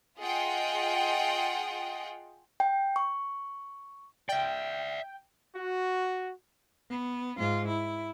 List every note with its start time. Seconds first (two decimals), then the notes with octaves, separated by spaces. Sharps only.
0.20 F4 G#4 D#5 F#5 G5
2.60 G5
2.96 C#6
4.29 D5 E5 G5
5.56 F#4
6.90 B3
7.38 G#2 F4
7.67 E4